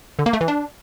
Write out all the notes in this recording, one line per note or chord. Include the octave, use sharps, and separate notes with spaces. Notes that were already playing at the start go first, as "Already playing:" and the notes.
D3
A#3
A3
E3
D4